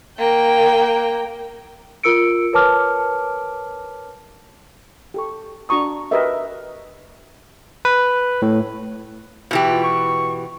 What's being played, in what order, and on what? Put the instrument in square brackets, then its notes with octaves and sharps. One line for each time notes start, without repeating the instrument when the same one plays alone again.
[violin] A#3 G5
[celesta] F4 A#4 E6 C#7 D7
A#4 B4 C#5 A5 D6 F6
[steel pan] G4 A4 C#6
D4 F#4 A#5 C#6 D#6
F#4 G4 A#4 B4 D#5 E5
[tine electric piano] B4
A2
[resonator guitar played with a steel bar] B2 E3 G4
[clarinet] F4
C#6